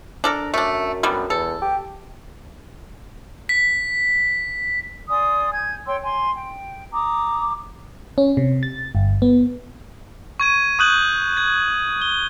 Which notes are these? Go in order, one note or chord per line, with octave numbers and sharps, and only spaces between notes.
D4 A4 A#4
F#2 A3 D4
D3 G3 B3
E2 A4
G4
B6
D5 G#5 C6 D#6
G#5 G6 G#6
C#5 G5 C6 E6
G#5 C6
G5
A#5 D6 D#6
C#4
C3
A6
G1
B3
C#6 G#6 D#7
C#6 D#6 F#6 G6 F#7
G#6
G7